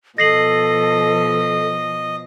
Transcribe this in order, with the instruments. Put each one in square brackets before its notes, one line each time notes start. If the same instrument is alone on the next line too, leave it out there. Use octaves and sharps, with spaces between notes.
[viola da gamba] B2 F3 [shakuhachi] A4 [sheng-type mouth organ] D#5 [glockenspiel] A#6 C7 F#7